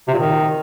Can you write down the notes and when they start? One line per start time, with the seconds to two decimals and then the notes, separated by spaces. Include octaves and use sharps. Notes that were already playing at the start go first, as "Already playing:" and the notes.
0.08 C3
0.13 A#2
0.18 D#3